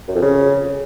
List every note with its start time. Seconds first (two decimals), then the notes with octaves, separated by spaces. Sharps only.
0.08 F#2
0.15 F2
0.22 C#3